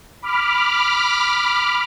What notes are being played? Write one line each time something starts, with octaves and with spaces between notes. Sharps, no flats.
B5 D6 F6